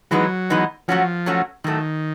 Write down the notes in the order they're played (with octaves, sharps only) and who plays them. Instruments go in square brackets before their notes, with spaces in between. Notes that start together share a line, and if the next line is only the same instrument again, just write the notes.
[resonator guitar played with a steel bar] E3 G#3 B3 D#4 [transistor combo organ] F#3
[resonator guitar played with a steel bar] E3 G#3 B3 D#4
[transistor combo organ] F3 [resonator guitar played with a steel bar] F#3 A3 C#4 F#4
[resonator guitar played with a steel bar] F#3 A3 C#4 F#4
[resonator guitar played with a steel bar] A2 F#3 A3 [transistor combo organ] D#3